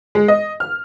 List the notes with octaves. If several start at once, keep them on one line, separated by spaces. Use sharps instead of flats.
G#3
D#5
F6